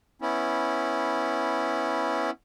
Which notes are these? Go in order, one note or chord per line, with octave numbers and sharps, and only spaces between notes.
B3 C#4 E4